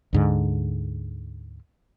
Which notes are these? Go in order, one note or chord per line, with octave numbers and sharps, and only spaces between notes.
D2 G#2 D3